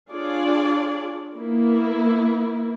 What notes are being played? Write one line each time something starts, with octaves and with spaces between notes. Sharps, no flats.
D4 F4 G#4 C#5 D5
A#3 B3 E4